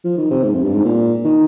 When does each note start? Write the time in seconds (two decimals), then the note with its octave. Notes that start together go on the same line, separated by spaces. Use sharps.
0.04 F3
0.18 D#3
0.31 C3
0.44 G#2
0.54 F2
0.64 G2
0.74 G#2
0.85 A#2
1.24 D#3